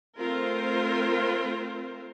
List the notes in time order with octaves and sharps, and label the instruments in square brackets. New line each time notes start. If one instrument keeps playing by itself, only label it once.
[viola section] A3 C4 F4 A#4 C5